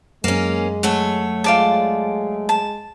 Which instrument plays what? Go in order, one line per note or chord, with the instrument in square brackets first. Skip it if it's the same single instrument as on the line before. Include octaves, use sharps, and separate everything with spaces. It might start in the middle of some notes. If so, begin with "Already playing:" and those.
[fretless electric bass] F#2 [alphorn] G#3 [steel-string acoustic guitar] A#3 C#4
[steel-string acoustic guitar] F#3 A3 C#5
[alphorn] G#3 [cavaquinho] F4 D5 A5
[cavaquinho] A5